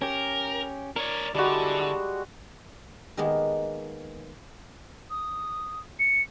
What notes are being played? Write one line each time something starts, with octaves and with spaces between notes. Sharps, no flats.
C#4 G4 A#4
D4 A#4 C#5 D5
D3 G3 G#3 E4 F#4 A4 D5
D#3 G#3 A#3 B3
D#6
C#7